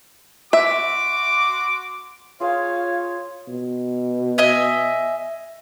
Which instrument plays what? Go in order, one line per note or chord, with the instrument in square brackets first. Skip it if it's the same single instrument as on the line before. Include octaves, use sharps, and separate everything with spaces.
[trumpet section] F#4 C6 D6 [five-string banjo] E5
[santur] F4 G#4 C5 [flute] C#5 [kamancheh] F5
[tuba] B2
[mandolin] D#5 E5 G#5